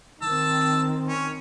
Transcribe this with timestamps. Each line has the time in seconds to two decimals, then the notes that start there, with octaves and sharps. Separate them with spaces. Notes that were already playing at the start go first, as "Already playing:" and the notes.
0.22 D#3 C4 A5 E6
1.09 C#4